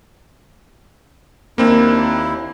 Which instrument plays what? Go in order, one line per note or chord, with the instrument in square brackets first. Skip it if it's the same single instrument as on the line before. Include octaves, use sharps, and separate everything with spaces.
[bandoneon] D#2 E4 [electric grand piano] A#3 C4 D4